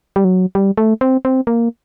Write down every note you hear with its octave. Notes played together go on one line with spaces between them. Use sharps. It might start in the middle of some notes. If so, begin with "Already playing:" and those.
G3
F#3
G3
A3
C4
C4
A#3